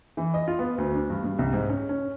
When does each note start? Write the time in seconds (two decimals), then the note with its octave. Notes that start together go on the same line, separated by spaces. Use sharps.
0.17 E3
0.34 D#5
0.48 F4
0.59 B3
0.78 D2
0.94 D4
1.10 G2
1.24 G2
1.39 C2
1.53 G#2
1.69 C#4
1.89 C#4